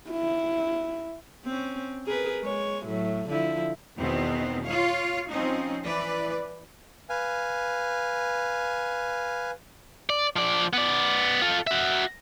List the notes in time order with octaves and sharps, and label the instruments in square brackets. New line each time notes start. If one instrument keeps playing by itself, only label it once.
[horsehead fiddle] E4
[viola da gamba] C4 C#4
G#4 A#4 B4
G#3 C#5
A2 F#3
D3 F3 E4
[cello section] E2 B2 D#3 B3 C4
F4 C#5 F5
F3 C4 C#4 D#4
E3 B4 D5
[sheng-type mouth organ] B4 F5 G#5
[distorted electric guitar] D5
F3 D5
B3 D5
F4 A4
F#4 E5